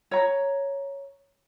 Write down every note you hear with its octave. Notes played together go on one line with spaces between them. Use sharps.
C#5 A#5